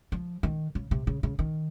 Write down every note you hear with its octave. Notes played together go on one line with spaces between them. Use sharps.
F3
D#3
C#3
C3
C#3
C#3
D#3